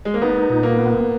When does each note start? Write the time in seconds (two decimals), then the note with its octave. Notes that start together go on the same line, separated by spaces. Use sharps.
0.05 G#3
0.14 A#3
0.22 B3 D#4
0.50 A#2
0.63 A#3
0.77 B3